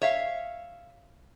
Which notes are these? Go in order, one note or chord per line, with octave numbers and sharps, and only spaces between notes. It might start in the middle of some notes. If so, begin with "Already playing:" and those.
C#5 E5 F5